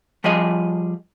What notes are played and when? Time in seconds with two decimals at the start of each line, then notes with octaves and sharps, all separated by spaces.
0.24 F3 G3 F4 G#4 D#5